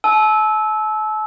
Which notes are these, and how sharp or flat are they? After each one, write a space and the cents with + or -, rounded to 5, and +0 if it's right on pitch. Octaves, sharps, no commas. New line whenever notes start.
A5 -40 E6 -15